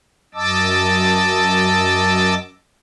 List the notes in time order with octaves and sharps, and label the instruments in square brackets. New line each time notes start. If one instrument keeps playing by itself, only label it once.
[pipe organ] F#2 D#5 A5 D6 E6